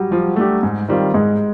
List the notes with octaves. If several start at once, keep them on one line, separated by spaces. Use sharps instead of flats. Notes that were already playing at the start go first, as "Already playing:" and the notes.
Already playing: F#3 G3
F3 G3
A3 D4 G4
G#2
D#3 G3 C4 F4
G#2 G#3